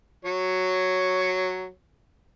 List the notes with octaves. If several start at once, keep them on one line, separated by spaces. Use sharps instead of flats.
F#3 C#5